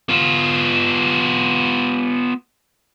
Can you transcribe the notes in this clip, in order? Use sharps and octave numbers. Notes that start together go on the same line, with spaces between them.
B3 F4